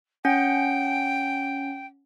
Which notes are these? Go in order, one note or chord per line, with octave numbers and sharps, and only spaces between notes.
C#4 F#5 G5